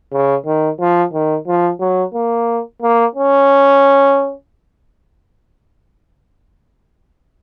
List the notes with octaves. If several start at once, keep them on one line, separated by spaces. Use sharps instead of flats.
C#3
D#3
F3
D#3
F3
F#3
A#3
A#3
C#4